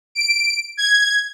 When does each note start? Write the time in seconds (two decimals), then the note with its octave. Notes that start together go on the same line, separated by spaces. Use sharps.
0.15 D7
0.77 G#6